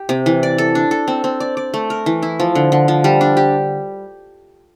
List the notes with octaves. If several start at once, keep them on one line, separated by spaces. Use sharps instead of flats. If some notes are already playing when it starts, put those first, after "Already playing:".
Already playing: G4
C3
E3
D5
A4
D4
A4
C4
C4
D5
D5
A3
A#4
E3
E4
F3
D3
D3
F3
G3
D4
G4